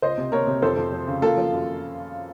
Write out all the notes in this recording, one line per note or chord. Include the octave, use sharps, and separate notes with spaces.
C#2 C5 D#5
C3
A#3 A#4 C#5
C3
F2 A4 C5
F2
F3
C#3
A#3 F4 A4
F3
F#2